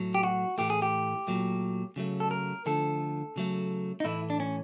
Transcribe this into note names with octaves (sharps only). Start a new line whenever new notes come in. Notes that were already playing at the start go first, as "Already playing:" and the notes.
Already playing: A2 F#3 A3
G4
F#4
A2 E3 A3 G4
G#4
G4
A#2 F#3 A3
C#3 F#3 A3
A4
A#4
D3 F3 A3 A4
C#3 F#3 A3
D#4
A2 E3 A3 E4
D4
C#4